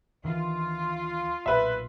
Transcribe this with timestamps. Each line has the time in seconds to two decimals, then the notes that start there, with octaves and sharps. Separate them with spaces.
0.24 D2 D#3 E3 F4
1.46 B1 A#2 B4 E5